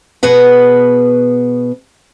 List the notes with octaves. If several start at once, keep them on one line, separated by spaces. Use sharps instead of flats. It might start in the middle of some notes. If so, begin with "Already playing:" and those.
B2 G#4 B4 F#5